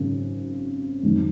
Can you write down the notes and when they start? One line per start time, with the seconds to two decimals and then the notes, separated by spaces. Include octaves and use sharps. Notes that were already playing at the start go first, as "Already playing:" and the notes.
Already playing: G#1 F#2 C#3
1.03 F2 D#3 F#3